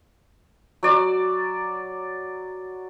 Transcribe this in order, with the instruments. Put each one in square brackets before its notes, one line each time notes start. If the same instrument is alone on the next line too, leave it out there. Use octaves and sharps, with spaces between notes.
[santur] F#3 D5